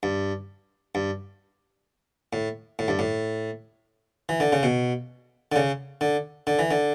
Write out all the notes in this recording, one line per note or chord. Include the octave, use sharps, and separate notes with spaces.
G2
G2
A2
A2
G2
A2
E3
D3
C#3
B2
D3
C#3
D3
D3
E3
D3